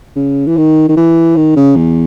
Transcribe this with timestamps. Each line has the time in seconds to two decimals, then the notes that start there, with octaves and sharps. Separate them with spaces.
0.16 C#3
0.47 E3
0.57 D#3
0.89 D#3
0.97 E3
1.36 D#3
1.56 C#3
1.76 E2